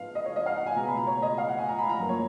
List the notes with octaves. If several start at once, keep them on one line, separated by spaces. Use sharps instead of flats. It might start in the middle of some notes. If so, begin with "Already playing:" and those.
Already playing: G#2 F3 B3 F5
D#5
C#5
D#5
F5
F#5
G#5
B2 G#3 B3 A#5
B5
A#5
C#5
D#5
F5
F#5
G#5
A#5
B5
A#5
F#2 F3 A#3
C#5